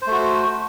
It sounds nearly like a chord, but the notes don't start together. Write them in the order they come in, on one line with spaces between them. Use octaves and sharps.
C5 A3 F#4